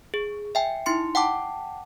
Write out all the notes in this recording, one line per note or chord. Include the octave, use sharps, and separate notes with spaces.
G#4
E5 G5 G#5
D#4 E4 C6 C#7
F#5 G5 A5 D6